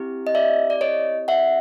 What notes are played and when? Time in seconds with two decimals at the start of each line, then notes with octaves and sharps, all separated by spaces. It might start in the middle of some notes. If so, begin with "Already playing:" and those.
Already playing: C4 E4 G4
0.27 D#5
0.35 D5 E5
0.70 D5
0.81 C#5 D#5
1.28 E5 F#5